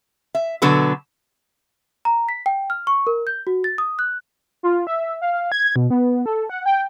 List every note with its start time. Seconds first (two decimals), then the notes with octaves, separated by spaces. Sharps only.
0.35 E5
0.62 B2 D3 F#3 A4 B4
2.05 A#5
2.29 B6
2.46 G5
2.70 F6
2.87 C#6
3.07 A#4
3.27 G6
3.47 F#4
3.64 A6
3.78 D#6
3.99 F#6
4.63 F4
4.87 E5
5.22 F5
5.52 G#6
5.76 B2
5.90 B3
6.26 A4
6.50 F#5
6.66 G5